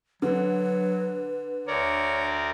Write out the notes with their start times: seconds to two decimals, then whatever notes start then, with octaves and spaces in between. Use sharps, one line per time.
0.22 D3 F#3 B4
1.67 D2 A#4 C#5 D5